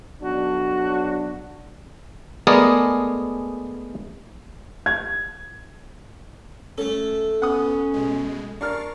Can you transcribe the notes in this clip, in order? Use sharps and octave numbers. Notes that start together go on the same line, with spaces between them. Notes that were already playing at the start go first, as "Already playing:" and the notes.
B1 F#3 D4 F#4
G#3 A3 B3 G#4 A#4 D5
G#6
A3 C#4 A4
B3 C#4 F#5 D#6
B2 G#3
D4 A#4 C#6 F6 A6 C7